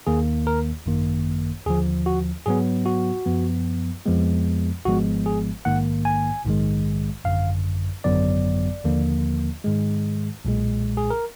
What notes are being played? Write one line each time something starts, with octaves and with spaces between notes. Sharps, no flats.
D#2 D#3 A#3 G#4
A#4
G#1 F#2 D#3 A#3
D#2 D3 F3 G#4
F#4
G#2 F#3 B3 G#4
F#4
F#2 F3 B3
F2 F3 G#3 B3
G#1 G#2 F3 G#3 B3 F#4
G#4
A#1 G#2 D#3 A#3 F#5
G#5
A#1 G#2 D#3 G#3
G#1 F#2 D3 F5
G#1 F#2 D3 F#3 B3 D5
D#2 D3 F3 A#3
G#2 D#3 G#3
B1 A#2 G#3
G#4
A#4